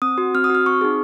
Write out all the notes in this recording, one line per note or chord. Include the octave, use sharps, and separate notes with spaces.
C4 D#6
F#4
C4 F6
D#6
F#4 F6
C4 C#6
D#4 G#4